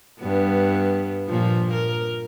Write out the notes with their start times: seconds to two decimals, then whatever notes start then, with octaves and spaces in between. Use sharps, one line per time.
0.21 G2 B3
1.28 A#2 F3
1.74 A#4